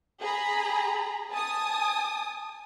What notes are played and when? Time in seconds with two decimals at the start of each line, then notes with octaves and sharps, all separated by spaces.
0.21 G#4 A#5 B5
1.31 G#5 A5 D#6